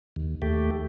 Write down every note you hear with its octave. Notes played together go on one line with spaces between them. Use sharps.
D#2
D#2 A3 G4